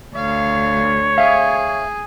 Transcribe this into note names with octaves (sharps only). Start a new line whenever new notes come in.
D2 C#5 F5
G#4 E5 F5